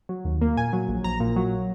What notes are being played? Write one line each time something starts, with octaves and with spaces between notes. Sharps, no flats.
F#3
D#2
A#3
A#2 G#5
F#3
A#1
A#1 A#5
A#2
F#3